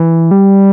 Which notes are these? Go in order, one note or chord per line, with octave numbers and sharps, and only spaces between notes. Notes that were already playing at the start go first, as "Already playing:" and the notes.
Already playing: E3
G3